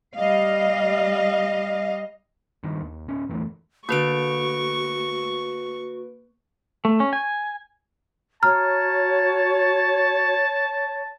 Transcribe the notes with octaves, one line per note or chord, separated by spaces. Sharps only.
G3 D#5 F5
G2 D#3
D#2
D1 C#4
G1 E2 E3 A3
D3 A#3 F#4 A4 B4 C#6 D7
A3
C#4
G#5
F#4 C#5 A5 A#5 F6